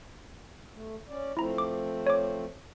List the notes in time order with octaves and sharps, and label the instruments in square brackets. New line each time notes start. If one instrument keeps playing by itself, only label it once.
[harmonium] A3
C#4 D5
[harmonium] F3 A3 C4 [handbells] E4 A#5
[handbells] D6
C#5 D6